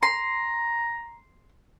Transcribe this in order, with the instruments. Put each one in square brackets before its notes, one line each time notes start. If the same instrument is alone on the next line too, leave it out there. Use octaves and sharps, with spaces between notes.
[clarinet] A#5 [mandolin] C6